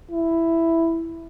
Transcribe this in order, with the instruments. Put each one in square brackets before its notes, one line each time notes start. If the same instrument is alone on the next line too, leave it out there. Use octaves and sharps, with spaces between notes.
[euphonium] E4